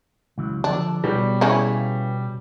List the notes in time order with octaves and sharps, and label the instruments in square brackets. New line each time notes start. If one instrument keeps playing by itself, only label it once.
[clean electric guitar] C#2 E3 F#3
[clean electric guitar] D3 F3 [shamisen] D4
[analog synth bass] B2 [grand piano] G3 [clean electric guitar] B4 C#5 G5
[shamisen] C#3 C#4 E4